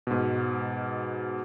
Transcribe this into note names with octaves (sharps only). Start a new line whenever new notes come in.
G#2 B2